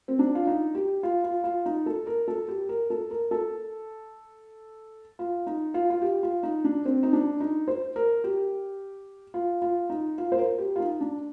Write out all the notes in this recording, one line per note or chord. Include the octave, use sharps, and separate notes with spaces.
C4
D4
F4
D#4
G4
F4
F4
F4
D#4
A4
A#4
A4
G4
A#4
A4
A#4
A4
F4
D#4
F4
F4
G4
F4
D#4
D4
C4
D#4
D4
D#4
C5
A#4
G4
F4
F4
D#4
F4
C5
A#4
G4
F4
D#4
D4